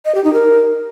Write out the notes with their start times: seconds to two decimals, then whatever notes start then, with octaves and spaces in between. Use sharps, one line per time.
0.05 D#5
0.15 G4
0.24 D#4
0.33 A#4